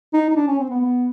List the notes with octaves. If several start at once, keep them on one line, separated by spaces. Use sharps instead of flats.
D#4
D#4
D4
C#4
C4
B3
B3